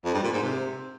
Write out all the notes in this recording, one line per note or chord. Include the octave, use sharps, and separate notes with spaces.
F2
G2
A#2
G#2
C3